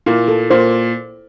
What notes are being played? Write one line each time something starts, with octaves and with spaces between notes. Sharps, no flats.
A#2 A#3 E4
A4
A#2 A#3 C5